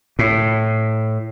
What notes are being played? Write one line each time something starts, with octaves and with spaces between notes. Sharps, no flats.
A2